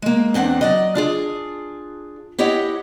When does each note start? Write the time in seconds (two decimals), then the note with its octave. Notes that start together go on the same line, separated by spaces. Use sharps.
0.02 G#3 A#3
0.34 E2 C4 D4 F#5
0.61 F#3 D5 D#5
0.95 D4 F4 G#4
2.39 E4 G4 C#5 D#5 F#5